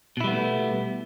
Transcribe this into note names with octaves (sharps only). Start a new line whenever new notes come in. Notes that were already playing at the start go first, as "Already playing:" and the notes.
B2 G3 A3 B3 E4